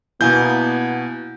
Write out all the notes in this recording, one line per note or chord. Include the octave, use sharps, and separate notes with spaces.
B2 A#3 B3 E4 G#5 G6